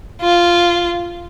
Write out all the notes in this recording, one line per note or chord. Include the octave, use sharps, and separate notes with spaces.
F4